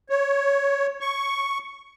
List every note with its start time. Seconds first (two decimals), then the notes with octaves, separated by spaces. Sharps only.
0.10 C#5
1.01 C#6